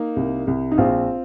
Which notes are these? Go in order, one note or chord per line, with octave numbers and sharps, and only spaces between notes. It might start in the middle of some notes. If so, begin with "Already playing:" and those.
Already playing: A#3 D#4
C2
C2
D#4
A#1 C4 F4